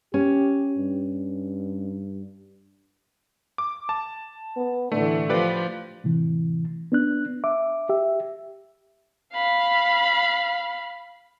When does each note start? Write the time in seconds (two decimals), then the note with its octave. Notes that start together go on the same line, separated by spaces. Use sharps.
0.14 C#4 G4
0.77 G2
3.58 D6
3.89 A5
4.57 B3
4.92 A2 D3 E3 A3
5.29 F3 G4 B4 D5
6.04 A2 C3 E3
6.92 B3 D4 F#6
7.44 E5 D6
7.89 G4 E5
9.34 F5 B5